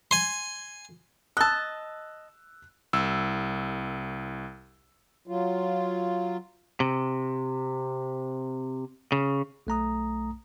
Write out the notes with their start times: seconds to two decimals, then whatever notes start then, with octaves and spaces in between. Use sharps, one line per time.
0.11 G#5 C6
1.37 D#5 A5 E6 F#6
2.93 C2 E6
5.27 F#3 F4
6.80 C3
9.12 C#3
9.67 B1 A3 A#5 D#6